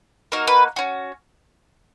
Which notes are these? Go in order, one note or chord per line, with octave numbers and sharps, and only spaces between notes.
A#3 D#4 F#4 A#4
B4
C#4 F#4